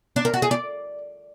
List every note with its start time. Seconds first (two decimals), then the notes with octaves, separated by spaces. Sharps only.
0.16 D4
0.25 A#4
0.34 F#4
0.42 G#4
0.51 D5